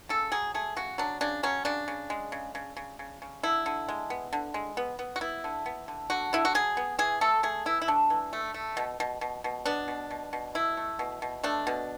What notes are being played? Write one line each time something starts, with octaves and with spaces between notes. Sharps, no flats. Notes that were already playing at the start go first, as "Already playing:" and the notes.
C#3 A4
F#3 G#4
A3 G#4
C#3 F#4
F#3 D4
C#3 D4
F#3 C#4
C#3 D4
C#3
G#3
C#3
C#3
C#3
C#3
C#3
D3 E4
D3
G#3
B3
D3
G#3
B3
B3
F#4
B3 E4
D3
B3
D3
D3 F#4
D3 E4
F#4
F#3 G#4
B3
E3 G#4
A3 A4
A3 G#4
E3 E4
E4
A3 D4
E3
A3
A3
B2
B2
B2
B2
B3 D4
B2
B2
B2
A3 E4
A3
B2
B2
A3 D4
B2